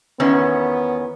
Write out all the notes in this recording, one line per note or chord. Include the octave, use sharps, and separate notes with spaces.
E2 D#3 B3 C#4